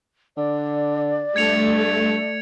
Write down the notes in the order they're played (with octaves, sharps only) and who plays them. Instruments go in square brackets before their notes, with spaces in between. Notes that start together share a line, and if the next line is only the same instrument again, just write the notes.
[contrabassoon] D3 [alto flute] D5
[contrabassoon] G2 [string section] A3 [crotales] G#6 C#7 F7